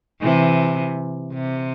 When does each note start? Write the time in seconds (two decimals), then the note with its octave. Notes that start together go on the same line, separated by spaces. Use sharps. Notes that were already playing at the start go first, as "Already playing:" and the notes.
0.22 C3 E3
1.33 C3